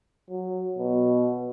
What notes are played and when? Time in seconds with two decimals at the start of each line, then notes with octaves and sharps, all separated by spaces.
0.30 F#3
0.78 B2